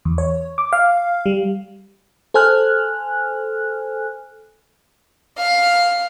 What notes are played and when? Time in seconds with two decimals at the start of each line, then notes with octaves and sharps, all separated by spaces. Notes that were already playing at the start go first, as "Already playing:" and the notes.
0.05 E2
0.18 C#5
0.58 D6
0.73 F5
1.26 G3
2.34 A4 C5 G#5 F6 F#6
5.38 F5